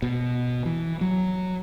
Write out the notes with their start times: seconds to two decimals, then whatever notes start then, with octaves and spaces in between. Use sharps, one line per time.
0.02 B2
0.66 E3
1.01 F#3